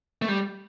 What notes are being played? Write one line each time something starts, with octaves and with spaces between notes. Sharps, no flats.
A3
G3